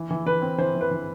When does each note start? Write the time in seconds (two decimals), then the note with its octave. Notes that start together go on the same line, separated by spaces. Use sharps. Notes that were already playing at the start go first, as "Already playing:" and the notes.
Already playing: E3
0.10 E3
0.26 E3 B4
0.42 C4
0.58 E3 C5
0.75 E3
0.81 B4
0.91 E3